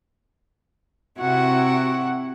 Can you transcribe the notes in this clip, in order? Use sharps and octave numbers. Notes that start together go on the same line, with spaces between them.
C3 E4 F#4 F#5 C#6